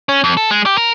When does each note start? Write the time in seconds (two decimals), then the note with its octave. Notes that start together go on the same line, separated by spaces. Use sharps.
0.09 C#4
0.24 F2
0.37 A4
0.51 G#3
0.66 G4
0.77 A#4